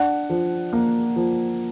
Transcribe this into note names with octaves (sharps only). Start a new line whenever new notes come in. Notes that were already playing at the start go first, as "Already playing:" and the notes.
Already playing: D4 F#5
F3
A#3
F3